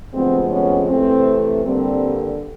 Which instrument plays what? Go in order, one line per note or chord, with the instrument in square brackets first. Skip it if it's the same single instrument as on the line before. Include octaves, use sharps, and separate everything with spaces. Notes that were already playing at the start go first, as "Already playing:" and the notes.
[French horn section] D2 C3 F3 G#3 B3 C4
B3 C#4
C3 E3 A3 C4
G2 D3 G3 A#3 C4